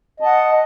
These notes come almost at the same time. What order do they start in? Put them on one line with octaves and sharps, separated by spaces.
D#5 A5 F#5